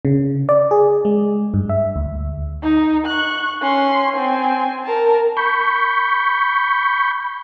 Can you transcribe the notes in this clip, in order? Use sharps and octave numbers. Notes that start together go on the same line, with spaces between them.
C#3
D5
G#4
G#3
G2
E5
D2
D#4
C#6 F#6
C#4 C6
C4 G#5
A#4 A5
B5 C#6 G6